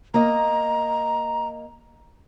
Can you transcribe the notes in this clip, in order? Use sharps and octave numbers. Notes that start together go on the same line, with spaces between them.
A#3 D#5 A#5